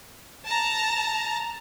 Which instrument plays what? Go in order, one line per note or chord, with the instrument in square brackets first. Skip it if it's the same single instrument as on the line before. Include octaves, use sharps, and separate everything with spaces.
[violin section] A5 A#5